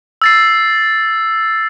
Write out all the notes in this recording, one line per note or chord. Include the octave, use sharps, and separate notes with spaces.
E6 A6 C7